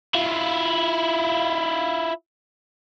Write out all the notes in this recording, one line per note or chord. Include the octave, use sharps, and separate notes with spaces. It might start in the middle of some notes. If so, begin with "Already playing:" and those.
E4 F4